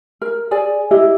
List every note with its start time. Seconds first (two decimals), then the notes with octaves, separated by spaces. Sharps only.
0.22 A#4
0.51 G#4 D5 G#5
0.91 E4 G4 D#5